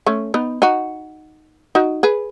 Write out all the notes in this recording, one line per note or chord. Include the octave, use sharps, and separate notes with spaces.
A3 C#4
B3 D#4
D#4 F#4
D#4 F#4
G#4 B4